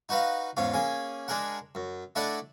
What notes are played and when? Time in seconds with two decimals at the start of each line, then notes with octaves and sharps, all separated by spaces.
0.09 D#4 F#4 B4 D#5 F5
0.57 E2 G#2 C#4 F5
0.74 A#3 C#4 G#4
1.28 G#3 D4 G#4 A#4 F#5
1.75 F#2
2.16 A3 D4 E4 D5 D#5 F#5